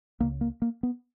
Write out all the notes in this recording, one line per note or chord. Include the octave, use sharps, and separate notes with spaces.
C#2 C#3 A#3
A#3
A#3
B3